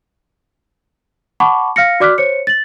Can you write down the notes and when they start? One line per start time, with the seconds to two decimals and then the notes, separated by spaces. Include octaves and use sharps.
1.40 F#5 A5 B5 C#6 D6
1.76 F5 F6 A#6 C#7
2.00 F#4 D5 D6 F6 F#6 B6
2.18 C5 C#5 C#7
2.47 A6 F#7